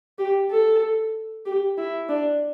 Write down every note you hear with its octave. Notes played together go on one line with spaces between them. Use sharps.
G4
A4
G4
E4
D4